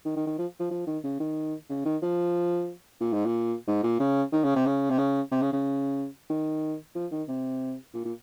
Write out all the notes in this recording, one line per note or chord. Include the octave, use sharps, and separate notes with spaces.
D#3
D#3
D#3
F3
F3
F3
D#3
C#3
D#3
C#3
D#3
F3
A#2
G#2
A#2
G#2
A#2
C#3
D#3
C#3
C3
C#3
C3
C#3
C3
C#3
C#3
D#3
F3
D#3
C3
A#2
A#2